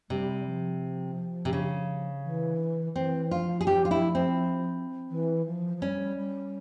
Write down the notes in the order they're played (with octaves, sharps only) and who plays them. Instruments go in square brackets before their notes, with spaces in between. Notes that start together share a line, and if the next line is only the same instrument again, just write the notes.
[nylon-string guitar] C3 [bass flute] G3
[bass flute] F3
[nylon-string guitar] C3
C#3
[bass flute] E3
[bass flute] E3 [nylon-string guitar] C4
[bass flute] F3 [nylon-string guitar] F4
[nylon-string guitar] G#4
[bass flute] F3 [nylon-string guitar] G4
[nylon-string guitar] F4
E4
C4
[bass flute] E3
F3
F3
[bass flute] G3 [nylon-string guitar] C#4
[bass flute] G3